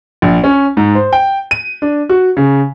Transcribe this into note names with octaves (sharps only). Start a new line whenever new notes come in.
A#1
C#4
G#2
C5
G5
D#7
D4
F#4
C#3